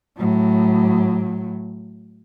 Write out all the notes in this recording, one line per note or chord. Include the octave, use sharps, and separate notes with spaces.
A2 F#3